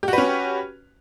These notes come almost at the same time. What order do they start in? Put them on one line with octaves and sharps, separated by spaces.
G4 F#4 B4 C#4